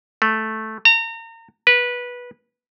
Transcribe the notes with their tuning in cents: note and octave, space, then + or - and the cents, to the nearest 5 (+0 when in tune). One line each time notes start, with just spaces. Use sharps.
A3 -5
A#5 -35
B4 -15